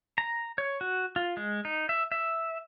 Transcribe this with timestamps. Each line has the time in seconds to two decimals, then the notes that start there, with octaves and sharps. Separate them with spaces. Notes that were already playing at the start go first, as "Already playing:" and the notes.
0.18 A#5
0.58 C#5
0.81 F#4
1.16 F4
1.37 G#3
1.65 D#4
1.89 E5
2.12 E5